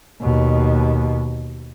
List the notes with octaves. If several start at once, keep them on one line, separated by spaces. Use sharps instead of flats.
D#2 B2